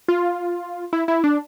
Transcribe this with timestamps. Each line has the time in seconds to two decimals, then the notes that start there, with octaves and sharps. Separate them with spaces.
0.08 F4
0.93 E4
1.08 E4
1.24 D4